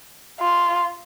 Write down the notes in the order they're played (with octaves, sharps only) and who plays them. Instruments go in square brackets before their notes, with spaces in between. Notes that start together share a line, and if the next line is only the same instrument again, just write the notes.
[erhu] F4